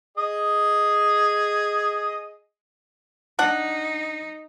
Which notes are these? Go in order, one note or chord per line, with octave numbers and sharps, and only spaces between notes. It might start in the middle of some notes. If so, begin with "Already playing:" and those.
G#4 D#5
D4 D#4 F#5